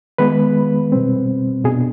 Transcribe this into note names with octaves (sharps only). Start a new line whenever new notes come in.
D#3 G#3 B3 B4
B2 G3 C4
B2 B3 D4 G#4